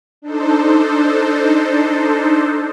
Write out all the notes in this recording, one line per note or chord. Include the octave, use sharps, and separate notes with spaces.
D4 D#4 A4 C5